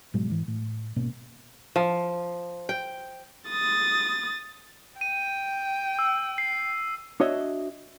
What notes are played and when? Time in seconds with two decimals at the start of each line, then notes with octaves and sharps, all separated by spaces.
0.14 G#2 B2 F#3 G#3
0.30 G#2 E3
0.48 A2
0.96 G#1 B2 A#3 C#4
1.76 F3
2.69 G5
3.50 D#6 A6
5.01 G5 D#7
5.99 E6
6.38 C7
7.20 D4 F#4 C#5 D#5 E5